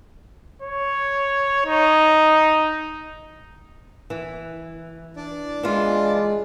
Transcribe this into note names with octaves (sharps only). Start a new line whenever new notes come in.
C#5
D#4
E3
D4 D5
E3 G#3 F4